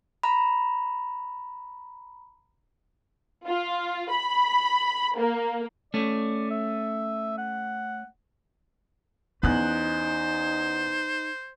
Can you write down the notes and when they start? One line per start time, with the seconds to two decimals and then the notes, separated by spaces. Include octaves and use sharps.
0.23 A#5 B5
3.46 F4
4.10 B5
5.17 A#3
5.94 A3 C#4 D5
6.51 E5
7.38 F#5
9.43 E2 C#4 D#4 C5 F#6